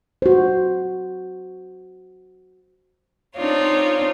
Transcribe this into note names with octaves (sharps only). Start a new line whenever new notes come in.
F#4 C5
C4 D4 D#4 F4 C#5